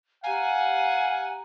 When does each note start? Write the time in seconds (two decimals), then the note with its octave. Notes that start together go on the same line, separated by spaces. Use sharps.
0.24 G4 F5 F#5 G#5 A#5